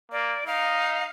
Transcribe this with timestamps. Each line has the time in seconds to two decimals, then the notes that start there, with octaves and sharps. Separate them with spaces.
0.12 A#3 D5
0.47 D#4 F5